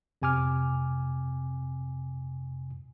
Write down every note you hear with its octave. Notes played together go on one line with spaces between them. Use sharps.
F2 C3 G#5 D6 F6